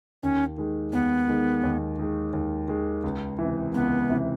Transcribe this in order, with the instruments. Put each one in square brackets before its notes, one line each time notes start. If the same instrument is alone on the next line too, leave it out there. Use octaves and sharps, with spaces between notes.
[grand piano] D#2 [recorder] C#4
[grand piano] D#3 G#3
[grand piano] D#2 [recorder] B3
[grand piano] D#3 G#3
D#2
D#3 G#3
D#2
D#3 G#3
C#2
C3 E3
[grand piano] C#2 [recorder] B3
[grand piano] C3 E3